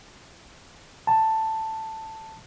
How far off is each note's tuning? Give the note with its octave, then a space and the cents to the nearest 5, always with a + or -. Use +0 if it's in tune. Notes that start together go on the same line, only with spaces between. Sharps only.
A5 +5